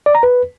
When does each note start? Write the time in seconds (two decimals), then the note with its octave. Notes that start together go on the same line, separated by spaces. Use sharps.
0.06 D5
0.15 A#5
0.23 B4